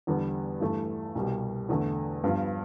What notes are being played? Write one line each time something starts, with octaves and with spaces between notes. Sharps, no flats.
E2 D3 G3 B3
G2 E3 A3
C2 B2 G3
E2 D3 A3
G2 F3 B3 F4